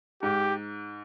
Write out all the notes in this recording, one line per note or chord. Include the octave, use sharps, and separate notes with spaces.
G#2 G4